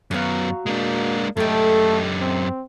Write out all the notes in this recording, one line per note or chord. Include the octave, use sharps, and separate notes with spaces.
F#2 F#3 B3 F#4 F5
G#3 A#3 D4
F#2 A3 D#4 G4 A4
C4